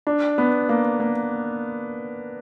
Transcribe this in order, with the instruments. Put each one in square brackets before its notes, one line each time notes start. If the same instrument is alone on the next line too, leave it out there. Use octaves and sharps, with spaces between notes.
[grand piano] D4
B3
A#3
A#3